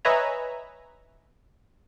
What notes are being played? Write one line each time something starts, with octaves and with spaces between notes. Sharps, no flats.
B4 C#5 D#5 E5 G#5 A#5